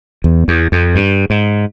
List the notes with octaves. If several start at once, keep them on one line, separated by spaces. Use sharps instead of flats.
E2
E2
F2
G2
G#2